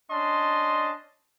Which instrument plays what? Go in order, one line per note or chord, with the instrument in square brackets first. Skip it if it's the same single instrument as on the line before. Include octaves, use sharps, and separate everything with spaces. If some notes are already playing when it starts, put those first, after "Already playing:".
[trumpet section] C#4 D4 D#5 A5 C6